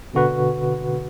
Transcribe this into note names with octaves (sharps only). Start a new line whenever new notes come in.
B2 D3 F#4 B4